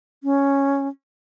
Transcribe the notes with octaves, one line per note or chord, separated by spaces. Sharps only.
C#4